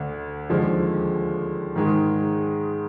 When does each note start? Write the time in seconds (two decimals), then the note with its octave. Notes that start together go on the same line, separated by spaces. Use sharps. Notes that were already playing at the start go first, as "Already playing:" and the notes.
Already playing: D2 D3
0.49 D#2 D3 F3 G#3
1.76 G#2 D#3 G#3